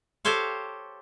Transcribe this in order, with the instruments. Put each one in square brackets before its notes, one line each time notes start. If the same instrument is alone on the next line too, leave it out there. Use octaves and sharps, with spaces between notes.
[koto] G4 A4 C5 C#5 F5